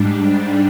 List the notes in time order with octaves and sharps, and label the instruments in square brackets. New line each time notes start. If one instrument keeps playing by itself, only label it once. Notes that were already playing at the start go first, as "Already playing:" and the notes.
Already playing: [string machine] G#2 G3 D4